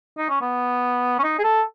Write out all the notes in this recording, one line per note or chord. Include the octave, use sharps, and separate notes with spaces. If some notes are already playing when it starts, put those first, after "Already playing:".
D#4
C#4
B3
C#4
D#4
G#4
A4